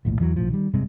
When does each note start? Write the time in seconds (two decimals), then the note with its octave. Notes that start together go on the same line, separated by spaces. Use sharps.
0.05 A#1 D#2 A2
0.20 E2 E3 F#3
0.36 A#1 A2 F3
0.50 D#3 G3
0.73 G#1 G2 C3 G#3